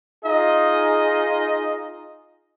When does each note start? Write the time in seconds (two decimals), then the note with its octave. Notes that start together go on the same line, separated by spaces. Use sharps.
0.24 D#4 F4 G#4 D#5